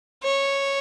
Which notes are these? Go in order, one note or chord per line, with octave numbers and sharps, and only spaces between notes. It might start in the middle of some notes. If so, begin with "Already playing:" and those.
C#5